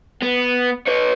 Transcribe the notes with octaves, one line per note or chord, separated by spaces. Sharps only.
B3
B4 C#5